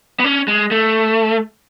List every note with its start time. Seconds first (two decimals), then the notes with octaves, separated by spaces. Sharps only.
0.20 B3
0.24 C#4
0.48 G#3
0.71 A3